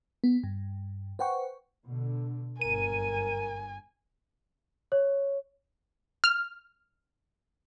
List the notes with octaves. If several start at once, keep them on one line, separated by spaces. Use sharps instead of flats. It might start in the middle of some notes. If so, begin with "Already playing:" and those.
B3
G2
B4 C5 F#5 G5 C#6
B2 D3
G1 F#2 A#2 A#4 G#5 D#7
C#5
F6